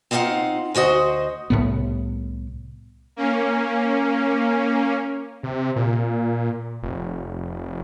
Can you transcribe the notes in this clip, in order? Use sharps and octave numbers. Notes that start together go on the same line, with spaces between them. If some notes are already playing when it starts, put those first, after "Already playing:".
C4 D#4 F4 D5 F5 F#5
D2 F#4 C5 D#5
C2 A2 B3
A#3 C#4
C3
A#2
F1